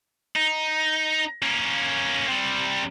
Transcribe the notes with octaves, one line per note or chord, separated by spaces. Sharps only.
D#4
A#3 C#4
C3 G3